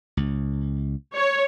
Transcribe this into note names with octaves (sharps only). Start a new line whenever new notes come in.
C#2
C#5